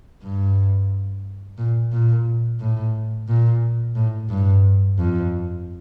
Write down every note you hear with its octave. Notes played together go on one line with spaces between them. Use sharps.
G2
A#2
A#2
A2
A#2
A2
G2
F2